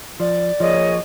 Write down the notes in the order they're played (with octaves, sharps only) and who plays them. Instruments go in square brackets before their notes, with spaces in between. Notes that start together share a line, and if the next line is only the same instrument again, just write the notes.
[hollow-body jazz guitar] F3 [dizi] D5
[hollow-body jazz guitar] F3 [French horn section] A#3 G#4 C#5 [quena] D#5